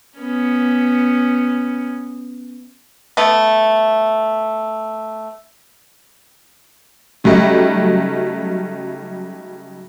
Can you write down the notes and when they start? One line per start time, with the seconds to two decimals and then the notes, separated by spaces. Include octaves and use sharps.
0.18 B3 C#4
3.17 A3 B3
7.24 C#3 F#3 G3 A3 D#4